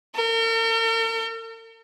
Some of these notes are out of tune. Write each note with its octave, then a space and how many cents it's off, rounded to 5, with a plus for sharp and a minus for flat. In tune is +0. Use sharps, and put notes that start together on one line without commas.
A#4 -45